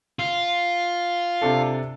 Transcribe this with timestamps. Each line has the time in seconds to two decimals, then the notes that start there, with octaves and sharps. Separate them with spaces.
0.19 F4
1.42 C3 D4 A4